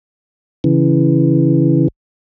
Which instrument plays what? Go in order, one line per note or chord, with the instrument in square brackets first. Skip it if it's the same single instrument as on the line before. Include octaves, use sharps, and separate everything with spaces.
[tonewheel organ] C#3 E3